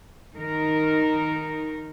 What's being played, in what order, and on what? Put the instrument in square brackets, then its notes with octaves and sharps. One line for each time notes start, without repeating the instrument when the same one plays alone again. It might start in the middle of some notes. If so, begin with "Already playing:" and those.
[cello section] D#3 D#4 A#4